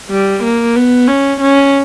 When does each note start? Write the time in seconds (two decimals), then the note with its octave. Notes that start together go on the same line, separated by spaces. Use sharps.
0.10 G3
0.43 A#3
0.75 B3
1.08 C#4
1.40 C#4